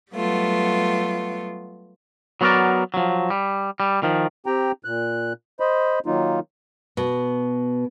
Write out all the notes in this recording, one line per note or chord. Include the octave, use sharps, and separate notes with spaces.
F#3 G3 A3 B3 F4
F#3 B3 F#4 G#4 A#4 D5
F3 F#3
G3
G3
D#3 F3
C4 G4 G5 A#5
A#2 F#6
C5 D#5 B5
D#3 F#3 A#3 D#4 F4
B2